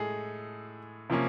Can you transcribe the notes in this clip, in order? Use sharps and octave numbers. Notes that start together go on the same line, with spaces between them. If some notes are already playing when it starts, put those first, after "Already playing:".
Already playing: A2 G#3 G#4 A4
C3 F3 A#3 C#4